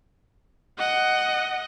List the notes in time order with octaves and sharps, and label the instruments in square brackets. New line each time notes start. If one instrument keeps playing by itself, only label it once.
[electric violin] D#5 F#5